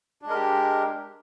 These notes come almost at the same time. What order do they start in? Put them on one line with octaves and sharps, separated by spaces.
D4 G#3 A#4 G4